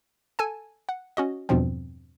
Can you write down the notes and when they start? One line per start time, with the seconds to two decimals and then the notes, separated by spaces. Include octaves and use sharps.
0.39 A4 G#5 A5
0.89 F#5
1.17 C#4 F#4 D#5
1.49 E2 G2 B2 F3 C4